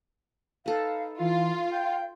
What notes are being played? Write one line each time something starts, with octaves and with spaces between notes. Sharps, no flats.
D#4 A4 B4 F5
E3 F4 F5
G5